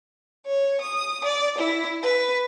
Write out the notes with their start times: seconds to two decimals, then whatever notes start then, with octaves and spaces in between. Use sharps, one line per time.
0.47 C#5
0.80 D#6
1.25 D5
1.58 E4
2.03 B4